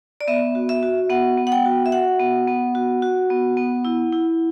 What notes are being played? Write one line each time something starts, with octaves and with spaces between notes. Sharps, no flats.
D5
B3 E5
F#4
E5
F#4
B3 F#5
B3
F#5
G5
F#4
E5
F#4 F#5
B3
B3
F#4
F#4
B3
B3
E4
E4